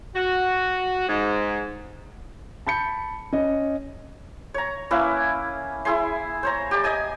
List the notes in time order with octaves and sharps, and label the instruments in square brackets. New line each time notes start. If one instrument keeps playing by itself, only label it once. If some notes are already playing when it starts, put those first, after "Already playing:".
[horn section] F#4
G#2
[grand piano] A5 B5 G6 C#7
C#4 D#5
[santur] C#5 A#5
A#3 C#4 E4 B4
E4 G#4 G#5 C6
C5 C#5 A#5
G4 D5
D#5 G#5 D#6